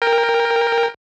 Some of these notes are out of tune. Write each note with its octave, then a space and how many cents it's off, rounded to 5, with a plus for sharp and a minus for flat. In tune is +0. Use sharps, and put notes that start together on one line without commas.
A#4 +0 G5 +25